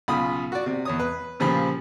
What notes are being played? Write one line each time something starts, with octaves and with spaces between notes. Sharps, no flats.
B1 C#3 F4 B5 D#6
F#4 D5
C3
E2 C#5 D#6
B4
A#2 C#3 F3 G4 B5